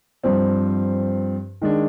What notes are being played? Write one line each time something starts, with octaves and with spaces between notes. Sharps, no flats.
G2 F3 C4
D#3 G#3 D4